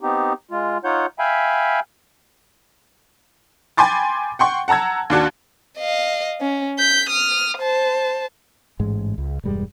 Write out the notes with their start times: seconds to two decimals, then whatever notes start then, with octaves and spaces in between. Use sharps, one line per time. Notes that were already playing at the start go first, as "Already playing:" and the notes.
0.01 B3 C4 D#4 G4
0.51 G#3 F4
0.84 D#4 F4 C#5 F#5 G6
1.19 E5 F5 G5 G#5 B5
3.77 G5 G#5 B5 C6 D6 A6
4.39 F#5 G5 C6 C#6
4.68 F#5 A5 A#5 E6 G#6
5.10 D#2 D4 F#4 A5
5.79 D#5 F5
6.41 C#4
6.79 G6 B6
7.10 D#6 F6
7.58 C5 A5
8.80 A1 G#2 G#3
9.18 C#2
9.44 E1 G2 G3 G#3